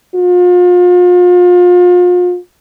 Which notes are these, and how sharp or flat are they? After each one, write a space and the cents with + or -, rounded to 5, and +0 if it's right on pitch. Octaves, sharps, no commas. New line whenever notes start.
F4 +35